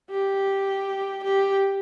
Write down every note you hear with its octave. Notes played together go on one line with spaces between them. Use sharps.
G4
G4